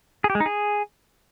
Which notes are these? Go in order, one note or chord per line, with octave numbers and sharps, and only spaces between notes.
G#4
G4
G#3
D#4
G#4